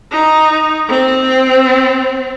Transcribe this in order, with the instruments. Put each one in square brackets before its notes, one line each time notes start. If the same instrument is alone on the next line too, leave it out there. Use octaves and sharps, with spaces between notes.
[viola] D#4
C4